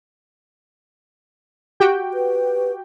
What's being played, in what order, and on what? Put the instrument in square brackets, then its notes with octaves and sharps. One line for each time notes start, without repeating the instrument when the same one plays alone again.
[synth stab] F#4 G4 G5
[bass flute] B4